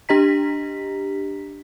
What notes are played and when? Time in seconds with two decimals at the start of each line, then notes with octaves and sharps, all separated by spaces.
0.09 D4 G4 D#5 A#5 B6